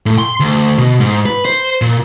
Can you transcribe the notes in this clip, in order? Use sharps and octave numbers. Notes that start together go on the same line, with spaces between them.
A2
C6
D2
B2
G#2
B4
C5
A#2